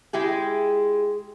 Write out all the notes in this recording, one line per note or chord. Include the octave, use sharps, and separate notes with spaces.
G#3 E4 G4 G#4